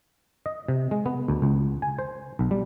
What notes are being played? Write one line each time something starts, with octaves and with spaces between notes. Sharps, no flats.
D#5
C3
G#3
B3
D2
C#2
G#5
C5
B1
G3